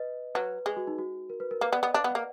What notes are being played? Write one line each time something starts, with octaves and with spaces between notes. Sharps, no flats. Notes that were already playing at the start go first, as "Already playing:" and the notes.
Already playing: B4 D#5
F#3 B4
G#3 G#4
F#4
D#4
F#4
A#4
B4
A#4
A#3 B4
B3 D5
B3 D#5
D4 F5
B3
A#3 F#5